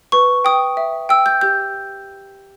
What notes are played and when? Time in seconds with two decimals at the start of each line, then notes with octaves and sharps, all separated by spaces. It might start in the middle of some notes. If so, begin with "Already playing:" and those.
0.12 B4 C#6
0.45 G5 D#6
0.77 E5
1.09 G5 E6
1.26 G6
1.41 G4 G6